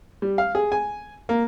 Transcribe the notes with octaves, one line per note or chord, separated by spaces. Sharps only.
G3
F5
G#4
G#5
A#3